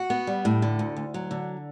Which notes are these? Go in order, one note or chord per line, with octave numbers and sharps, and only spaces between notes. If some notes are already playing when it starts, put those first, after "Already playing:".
Already playing: F#4
B3
G3
A2
D3
D2
D2
F#3
D3